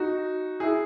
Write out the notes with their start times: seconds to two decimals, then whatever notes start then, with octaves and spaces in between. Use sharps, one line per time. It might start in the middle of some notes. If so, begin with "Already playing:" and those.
Already playing: D#4 F#4
0.60 E4 G#4